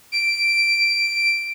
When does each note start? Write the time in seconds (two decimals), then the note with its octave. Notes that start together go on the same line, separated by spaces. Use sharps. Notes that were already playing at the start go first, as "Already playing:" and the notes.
0.12 D7